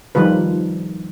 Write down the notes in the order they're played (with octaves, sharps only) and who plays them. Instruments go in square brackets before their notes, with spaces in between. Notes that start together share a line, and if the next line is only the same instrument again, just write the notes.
[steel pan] D#3 F3 G3 F4 B4